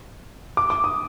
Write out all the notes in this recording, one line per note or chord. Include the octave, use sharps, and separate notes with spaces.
D6
D6
D#6